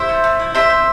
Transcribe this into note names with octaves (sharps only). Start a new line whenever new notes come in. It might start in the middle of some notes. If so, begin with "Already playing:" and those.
Already playing: E4 C5 E5
A3
A3
E4
C4 C5 E5
C4